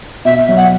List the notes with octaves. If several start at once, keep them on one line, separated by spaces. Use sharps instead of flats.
B2 E5
F#3
F#5